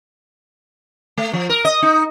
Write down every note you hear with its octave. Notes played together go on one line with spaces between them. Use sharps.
A3
F3
A#4
D#5
D#4